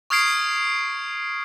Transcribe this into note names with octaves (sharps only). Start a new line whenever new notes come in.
C#6 D#6 F6 G#6 C7 D7